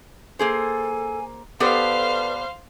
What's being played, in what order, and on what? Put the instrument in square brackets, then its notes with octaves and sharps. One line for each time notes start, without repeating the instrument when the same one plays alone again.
[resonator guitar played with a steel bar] A#3 G#4 C5 [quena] A4 [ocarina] G#5
[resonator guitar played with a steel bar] B3 G4 A4 [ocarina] B4 [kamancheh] C5 F5 [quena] D5